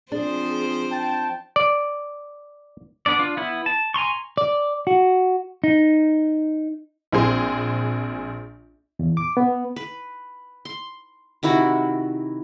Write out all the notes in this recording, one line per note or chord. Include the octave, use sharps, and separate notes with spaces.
F3 C4 D4 G#4 C5
G5 A5
D5
B3 D4 D5
D4 F4
B3 E4
A5
G#5 A#5 C6 C#6
D5
F#4
D#4
A#1 C4 G#4 C6
E2
D6
B3
B4
C6
C3 D#3 E4 F#4